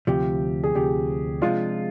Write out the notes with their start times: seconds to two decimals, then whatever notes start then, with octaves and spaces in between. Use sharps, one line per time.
0.07 D2 C3 F3 G4
0.64 G#4
0.74 D2 C3 F3 G4
1.42 C3 F3 G#3 D4 F4